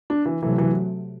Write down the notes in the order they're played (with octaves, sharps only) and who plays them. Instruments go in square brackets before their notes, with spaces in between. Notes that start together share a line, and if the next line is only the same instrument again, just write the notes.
[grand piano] D4
E3
[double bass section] C3 F#3 A3 [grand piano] E3
[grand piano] E3